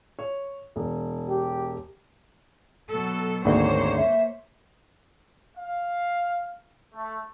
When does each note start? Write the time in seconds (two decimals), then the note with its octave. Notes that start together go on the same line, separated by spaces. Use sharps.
0.19 C#5
0.76 E1
1.30 G4
2.90 B2 F#3 A4
3.45 G#1 D2 A#3 C5 C#5
3.97 E5
5.56 F5
6.94 A3